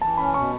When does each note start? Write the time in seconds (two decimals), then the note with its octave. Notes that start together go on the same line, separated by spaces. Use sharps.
0.01 E3 A5
0.17 C#4 B5
0.34 B2 C#6